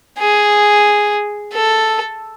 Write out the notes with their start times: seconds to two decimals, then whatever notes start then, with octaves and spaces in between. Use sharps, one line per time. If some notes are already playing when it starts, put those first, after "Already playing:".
0.19 G#4
1.53 A4